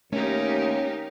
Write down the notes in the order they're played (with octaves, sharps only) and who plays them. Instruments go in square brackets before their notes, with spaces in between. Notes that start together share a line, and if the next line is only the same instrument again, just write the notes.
[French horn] D#2 [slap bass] A3 [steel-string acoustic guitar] C#4 [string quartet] D#4 G4 A#4